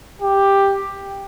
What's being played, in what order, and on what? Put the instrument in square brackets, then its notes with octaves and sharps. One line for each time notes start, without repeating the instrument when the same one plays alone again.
[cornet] G4